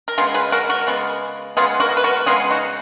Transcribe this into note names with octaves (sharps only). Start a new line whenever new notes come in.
A#4
C#3 G#3 B3 F4 G#4
G#4 B4
F#4 A#4
F#4 A#4
C#3 G#3 B3
C#3 G#3 B3 F4 G#4
F#4 A#4
B4
F#4 A#4
C#3 G#3 B3 F4 G#4
D#4 F#4